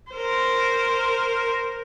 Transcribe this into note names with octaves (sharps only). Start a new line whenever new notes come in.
A#4 C5